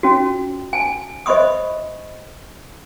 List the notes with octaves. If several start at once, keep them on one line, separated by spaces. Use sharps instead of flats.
C#4 F4 F#4
G#5 A5
C5 D#5 E5 B5 C#6 D#6